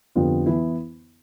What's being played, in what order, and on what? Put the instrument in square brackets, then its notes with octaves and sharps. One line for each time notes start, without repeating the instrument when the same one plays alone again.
[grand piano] F2 D3 G3 B3 F4
E3 B3 E4